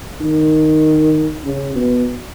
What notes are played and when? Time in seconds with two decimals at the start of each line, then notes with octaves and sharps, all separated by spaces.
0.20 D#3
1.44 C#3
1.75 B2